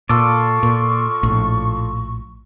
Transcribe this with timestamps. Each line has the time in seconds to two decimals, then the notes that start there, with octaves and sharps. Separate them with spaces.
0.09 A#2 F4 A4 D5 C#6
0.63 A#2
1.23 A#1 A2